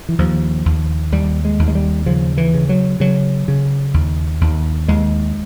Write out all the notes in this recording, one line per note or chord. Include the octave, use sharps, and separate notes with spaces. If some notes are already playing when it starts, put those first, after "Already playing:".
E3
D#2 F3
D#2
D#2 G3
G#3
D#2
G#3
G3
C#3 F3
E3
C#3
F#3
C#3 F#3
C#3
D#2
D#2
D#2 G#3